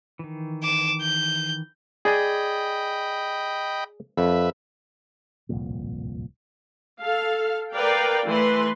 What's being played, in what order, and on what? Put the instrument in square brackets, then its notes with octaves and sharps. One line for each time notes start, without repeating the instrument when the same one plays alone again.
[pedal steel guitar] D#3 E3
[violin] D6 E7
G6
[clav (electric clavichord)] G#4 D5 G#5 [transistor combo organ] D#5 G5 B5
[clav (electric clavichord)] F2 [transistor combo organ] B4 E5
[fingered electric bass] D1 C2 F2 A#2
[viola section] A4 F5
A#4 B4 D5 F5 G5
E3 A3 B4 C6